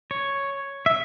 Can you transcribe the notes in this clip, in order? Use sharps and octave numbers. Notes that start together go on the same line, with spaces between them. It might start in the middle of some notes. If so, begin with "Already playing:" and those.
C#5
E5